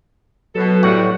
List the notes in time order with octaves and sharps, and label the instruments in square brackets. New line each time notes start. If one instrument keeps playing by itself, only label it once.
[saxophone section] B2 A4 [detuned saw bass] F#3
[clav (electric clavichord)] A2 F#4 [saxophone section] G3 F#5